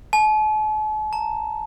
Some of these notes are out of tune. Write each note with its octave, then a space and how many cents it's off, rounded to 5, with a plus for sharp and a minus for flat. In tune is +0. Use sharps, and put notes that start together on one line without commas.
A5 -45
A#5 -35